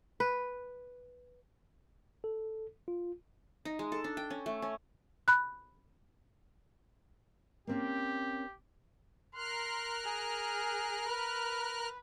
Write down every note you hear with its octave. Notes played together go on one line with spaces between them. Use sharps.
B4
A4
F4
D#4
G#3
A4
D4
G5
C#4
A3
C#4
B5 F#6
A#3 C4 C#4 G4
A#4 C6 F6 F#6
G#4
B4